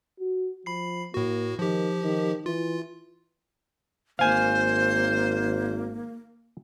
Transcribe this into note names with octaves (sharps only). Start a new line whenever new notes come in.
F#4
F3 B5 C7
A2 A#3 F#4
D#3 F3 G4
D#3
E3 F4
G#1 A#3 C5 F5 G#5